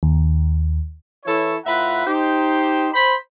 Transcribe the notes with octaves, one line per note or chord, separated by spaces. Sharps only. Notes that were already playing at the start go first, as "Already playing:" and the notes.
D#2
E3 E4 A4 C#5
A2 F4 B4 E5 F#5 A#5
D#4 G4 C5
C5 B5